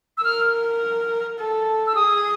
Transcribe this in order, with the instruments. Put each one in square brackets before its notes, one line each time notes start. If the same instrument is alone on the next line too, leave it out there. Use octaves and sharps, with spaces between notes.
[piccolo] E6
[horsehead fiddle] A#4 [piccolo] F6
[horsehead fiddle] A4
[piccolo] E6
[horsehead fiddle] G#4 [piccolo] D#6